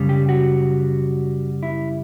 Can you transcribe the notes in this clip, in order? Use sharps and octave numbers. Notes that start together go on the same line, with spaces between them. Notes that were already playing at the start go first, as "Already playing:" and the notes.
Already playing: F#2 C#3 G3
G4
F#4
E4